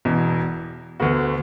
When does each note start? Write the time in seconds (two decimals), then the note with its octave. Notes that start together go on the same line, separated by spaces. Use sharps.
0.05 E1 E2 B2
1.00 D2 D3 B3 F#4